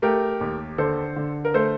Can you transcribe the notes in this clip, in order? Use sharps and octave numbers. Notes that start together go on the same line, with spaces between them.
A3 G4 A#4
D#2
D3 A4 C5
D3
A#4
A3 A4 C5